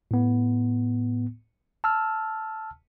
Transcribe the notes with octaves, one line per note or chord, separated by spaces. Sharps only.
A2 B3
A5 E6 F6